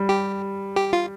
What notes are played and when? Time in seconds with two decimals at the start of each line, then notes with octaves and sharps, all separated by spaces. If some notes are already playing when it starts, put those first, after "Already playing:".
Already playing: G3
0.09 G4
0.76 G4
0.93 F4